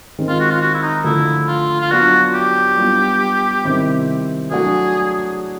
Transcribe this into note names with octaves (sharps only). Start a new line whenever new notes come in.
D#3 G#3 C4
F4
F#4
F4
F#4
E4
D#4
D3 F3 A3 E4
F4
F4
F#3 B3 D4 F4 F#4
G4
G3 B3 D4 F4
C3 D#3 G3 C4 E4
F#3 A3 D4 F#4 G#4